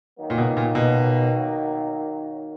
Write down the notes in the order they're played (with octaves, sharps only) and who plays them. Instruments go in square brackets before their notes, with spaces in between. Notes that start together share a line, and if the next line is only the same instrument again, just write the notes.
[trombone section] D#3 F#3 A#3
[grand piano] A#2
B2
A#2
B2